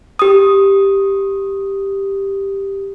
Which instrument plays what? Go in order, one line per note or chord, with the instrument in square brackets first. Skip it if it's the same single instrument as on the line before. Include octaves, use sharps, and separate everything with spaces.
[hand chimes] G4 D#6